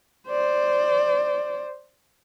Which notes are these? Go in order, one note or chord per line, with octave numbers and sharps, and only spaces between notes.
C5 D5